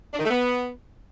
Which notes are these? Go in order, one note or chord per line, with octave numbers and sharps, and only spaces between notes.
D4
D#3
A3
B3